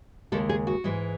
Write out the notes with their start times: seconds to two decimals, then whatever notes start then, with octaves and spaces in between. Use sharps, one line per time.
0.32 D#2 C#3 G#3 A4
0.49 G#4
0.67 F#4
0.84 G#2 E3 G#3